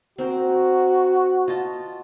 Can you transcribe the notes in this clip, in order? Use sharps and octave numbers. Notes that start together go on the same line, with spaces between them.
C4 F#4 A#4 C5
F4 D#5 A5